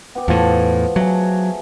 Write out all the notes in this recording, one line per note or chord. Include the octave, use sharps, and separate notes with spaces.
B3 G4
E2 A2 F3
F#3 A3 G#4